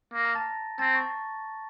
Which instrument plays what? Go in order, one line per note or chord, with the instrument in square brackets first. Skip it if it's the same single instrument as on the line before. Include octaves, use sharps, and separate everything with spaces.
[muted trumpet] A#3
[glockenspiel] A#5 A#6
A5 A6
[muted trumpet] C4 [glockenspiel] A5 A6
[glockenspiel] C#6